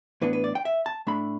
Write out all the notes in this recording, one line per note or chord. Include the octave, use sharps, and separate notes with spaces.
A2 E3 B3 D4 B4
B4
D5
G5
E5
A5
A2 A3 D4 B5